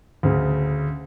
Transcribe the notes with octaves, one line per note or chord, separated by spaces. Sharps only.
D2 C#3